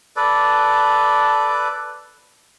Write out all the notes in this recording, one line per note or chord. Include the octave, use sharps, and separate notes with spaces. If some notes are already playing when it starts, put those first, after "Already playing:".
A4 B4 D5